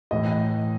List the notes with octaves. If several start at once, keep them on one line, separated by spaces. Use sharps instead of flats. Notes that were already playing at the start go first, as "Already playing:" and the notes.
A2 E3 D#5